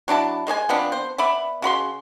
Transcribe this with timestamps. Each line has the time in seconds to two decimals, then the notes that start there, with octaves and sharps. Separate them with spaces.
0.08 F#3 D4 E4 A5
0.47 G#3 C5 D5 G#5
0.69 F3 B3 C4 D4
0.92 C5
1.18 B3 D5 E5 B5
1.62 C#3 F#4 B5 C6